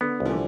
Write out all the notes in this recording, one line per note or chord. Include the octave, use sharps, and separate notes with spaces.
D3 B3
C2 F3
D3 E3